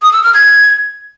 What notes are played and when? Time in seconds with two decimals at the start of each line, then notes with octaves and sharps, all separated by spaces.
0.02 D#6
0.13 E6
0.23 F6
0.34 G#6